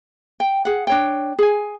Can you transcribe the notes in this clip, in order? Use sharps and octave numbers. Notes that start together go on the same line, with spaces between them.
G5
G#4 F#5
D4 C#5 G5
G#4 G#5